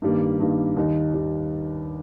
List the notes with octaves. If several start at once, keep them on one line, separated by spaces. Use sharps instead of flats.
G2 D#3 G3 A#3
G2 D#3 G3 A#3
D#2 D#3 G3 D#4
D#2 D#3 G3 D#4